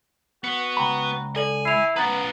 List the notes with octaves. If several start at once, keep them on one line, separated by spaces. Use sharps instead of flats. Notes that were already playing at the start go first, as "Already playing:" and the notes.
B3 F#4 C#7
C#2 G5 A#5 B5
A4 D5 G#5 F#7
E4 C7 F7
B3 C#4 B4 A#5 A6